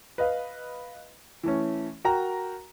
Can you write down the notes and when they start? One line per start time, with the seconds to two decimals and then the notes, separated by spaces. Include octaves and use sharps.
0.18 B4 D#5 F5
1.43 E3 A3 C#4
2.05 F#4 A#4 G5 A#5